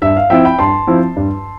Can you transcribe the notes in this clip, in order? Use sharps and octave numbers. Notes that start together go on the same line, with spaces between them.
G2 E5
F5
F3 C4 E4 E5 G5
G5 B5
G2 A5 C6
F3 C4 E4
G2